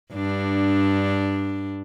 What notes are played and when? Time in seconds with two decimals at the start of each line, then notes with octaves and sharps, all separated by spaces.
0.14 G2 D4